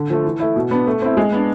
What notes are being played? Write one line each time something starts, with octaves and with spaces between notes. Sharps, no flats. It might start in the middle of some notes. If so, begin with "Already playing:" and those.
Already playing: D3
F3 A3
E3
A3 E4
B2
B3 D4
A3
C4 E4
G#3
B3 D4